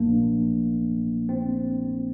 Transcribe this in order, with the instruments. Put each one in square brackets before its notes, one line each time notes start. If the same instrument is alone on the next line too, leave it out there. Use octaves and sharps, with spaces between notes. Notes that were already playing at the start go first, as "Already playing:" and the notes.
Already playing: [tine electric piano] A#1 A#2 F3 A#3 D4
C4